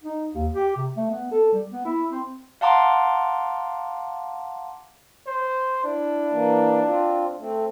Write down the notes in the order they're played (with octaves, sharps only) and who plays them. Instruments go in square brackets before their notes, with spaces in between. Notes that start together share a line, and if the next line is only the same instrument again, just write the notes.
[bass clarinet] D#4
D#2
G4
C3
A3
B3
A4
G3
B3
E4
C4
[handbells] F5 F#5 A5 A#5 C6 D6
[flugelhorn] C5
[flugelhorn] D4 [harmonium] E4
[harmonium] E3 A#3
C4 F4
A3 C4